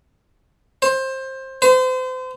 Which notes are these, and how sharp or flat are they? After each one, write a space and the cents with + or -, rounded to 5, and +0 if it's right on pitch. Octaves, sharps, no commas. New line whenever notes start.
C5 +20
C5 -35